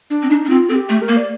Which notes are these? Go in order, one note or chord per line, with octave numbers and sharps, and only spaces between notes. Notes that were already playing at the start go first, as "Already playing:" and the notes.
D4
C4
D4 D#4
D4
C4 F4
C4 A4
G4
A3
A#4
A#3
D5